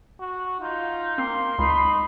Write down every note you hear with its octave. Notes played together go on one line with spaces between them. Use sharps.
F#4
D#4 F4
A#3 C4 C6
C#2 D#4 B5